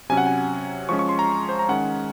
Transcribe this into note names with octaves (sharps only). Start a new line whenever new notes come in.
C3 F#3 C#4 G#5
F#5
G#5
F3 G#3 C#4 C#6
C#6
C6
A#5
C5
A#5
D#3 G#3 C#4 F#5